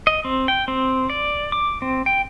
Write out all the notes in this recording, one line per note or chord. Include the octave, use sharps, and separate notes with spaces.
D#5
C4
G5
C4
D5
D6
C4
G5